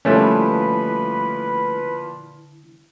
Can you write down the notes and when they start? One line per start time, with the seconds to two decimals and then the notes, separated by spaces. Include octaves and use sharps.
0.05 A#2 D3 F3 G3 A3 C#4 E4 B4